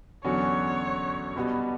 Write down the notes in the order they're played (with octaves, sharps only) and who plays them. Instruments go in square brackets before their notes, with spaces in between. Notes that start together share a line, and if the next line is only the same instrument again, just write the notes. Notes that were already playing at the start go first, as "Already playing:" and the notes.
[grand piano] E2 D3 F#3 C#4 F#4 [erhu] C#5
[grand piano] B2 G3 B3 F#4 B4